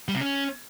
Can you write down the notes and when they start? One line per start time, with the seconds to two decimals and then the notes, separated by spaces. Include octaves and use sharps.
0.08 G3
0.15 C3
0.21 C#4